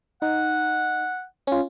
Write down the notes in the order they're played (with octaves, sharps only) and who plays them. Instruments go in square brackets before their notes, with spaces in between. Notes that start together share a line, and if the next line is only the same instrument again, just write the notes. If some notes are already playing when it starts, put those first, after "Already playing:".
[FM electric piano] D#4 [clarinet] F#5
[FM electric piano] C#4 F4